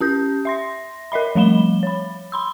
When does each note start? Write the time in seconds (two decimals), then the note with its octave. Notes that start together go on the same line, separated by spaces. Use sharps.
0.01 C#4 G4 G6
0.45 E5 C6 A#6
1.12 A#4 D#5 E5 B5
1.35 F3 G3 A3 B5 E7 G7
1.83 C#5 B5
2.32 B5 C6 E6